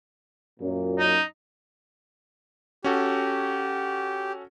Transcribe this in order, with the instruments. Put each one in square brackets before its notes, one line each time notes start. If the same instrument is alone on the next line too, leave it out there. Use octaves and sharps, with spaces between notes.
[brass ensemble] F#2 A#2
[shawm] D#4
[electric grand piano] C#4 F#4 A4 [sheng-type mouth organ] G4